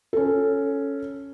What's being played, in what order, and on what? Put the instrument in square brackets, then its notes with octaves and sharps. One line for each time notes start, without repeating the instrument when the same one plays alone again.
[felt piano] C#4 A4